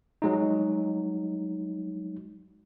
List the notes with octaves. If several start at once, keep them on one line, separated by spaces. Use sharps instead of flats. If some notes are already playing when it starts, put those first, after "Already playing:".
F#3 G#3 D#4